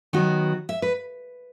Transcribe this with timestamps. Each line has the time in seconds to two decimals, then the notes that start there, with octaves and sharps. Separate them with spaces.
0.13 D#3 F#3 B3 F#4
0.69 E5
0.82 B4